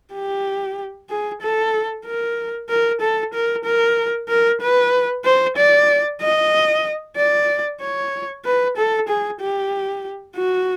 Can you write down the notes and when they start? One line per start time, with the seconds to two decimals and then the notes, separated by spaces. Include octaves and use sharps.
0.14 G4
1.10 G#4
1.41 A4
2.06 A#4
2.69 A#4
3.01 A4
3.34 A#4
3.65 A#4
4.29 A#4
4.61 B4
5.25 C5
5.57 D5
6.21 D#5
7.17 D5
7.81 C#5
8.45 B4
8.77 A4
9.08 G#4
9.41 G4
10.36 F#4